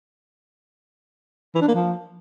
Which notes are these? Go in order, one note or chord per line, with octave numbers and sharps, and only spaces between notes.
E3
D4
A#3
F3